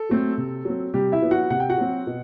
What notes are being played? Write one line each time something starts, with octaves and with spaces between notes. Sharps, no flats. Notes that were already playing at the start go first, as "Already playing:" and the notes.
Already playing: A4
F#3 A3 C4
C3
F#3 C4
C3 G3 G4
E4 E5
F#3 B3
F#4 F#5
C3 F#5
G5
F#4 F#5
F#3 C4
B2